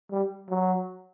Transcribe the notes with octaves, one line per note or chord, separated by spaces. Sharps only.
G3
F#3